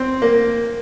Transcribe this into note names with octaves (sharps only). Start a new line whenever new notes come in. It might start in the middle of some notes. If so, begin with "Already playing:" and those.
Already playing: C4
A#3